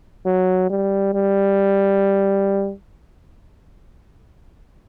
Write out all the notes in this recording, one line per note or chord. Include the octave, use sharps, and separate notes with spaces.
F#3
G3
G3